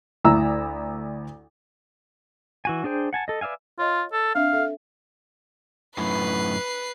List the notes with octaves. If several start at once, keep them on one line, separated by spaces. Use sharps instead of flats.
D2 E4 A#5 E6
E3 F#4 G#5
D4 G#4 C5 G5
F#5 G#5 A5
A4 D#5
B4 D5 E5 F5 G#5
F4 C#5 D#5
A4
C4 D4 E5 F5
A4 E5
F#2 A2 B4 C7